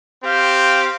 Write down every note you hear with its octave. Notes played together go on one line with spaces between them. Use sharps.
C4 G4 F5